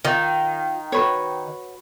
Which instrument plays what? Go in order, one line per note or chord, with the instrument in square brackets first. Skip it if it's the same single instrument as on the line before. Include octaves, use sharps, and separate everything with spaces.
[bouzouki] D#3 [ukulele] F4
[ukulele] F#4 B4 C#5